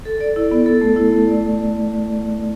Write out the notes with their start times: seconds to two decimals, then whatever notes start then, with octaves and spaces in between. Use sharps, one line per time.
0.05 A4
0.20 D5
0.36 E4
0.51 B3
0.66 A4
0.81 A3
0.96 E4
1.12 A3
1.27 D5